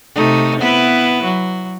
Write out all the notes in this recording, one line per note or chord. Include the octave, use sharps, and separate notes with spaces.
C3 A3 D#4
B3 E4 B4
F#3